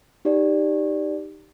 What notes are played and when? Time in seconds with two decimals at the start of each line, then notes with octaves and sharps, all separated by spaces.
0.25 D#4 G4 D5